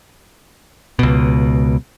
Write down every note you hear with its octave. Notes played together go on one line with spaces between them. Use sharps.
C#2 B2